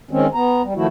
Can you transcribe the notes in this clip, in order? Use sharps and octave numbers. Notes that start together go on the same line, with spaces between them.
D#3 G#3 C4 C#4
B3 A#5
G3
D#3 F3 A3 E4 F#4